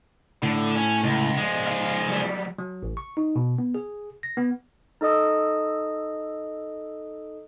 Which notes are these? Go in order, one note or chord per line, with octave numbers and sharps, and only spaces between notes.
A2 D3
C#4
C#2
F3 G#3
F5
F#3 G3
F#3
A1
C#6
D#4
B2
B3
G#4
A#6
B3
D#4 A4 D#5 D#6 E6